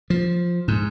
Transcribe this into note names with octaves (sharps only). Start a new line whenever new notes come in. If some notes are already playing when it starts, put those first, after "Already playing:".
F3
G#2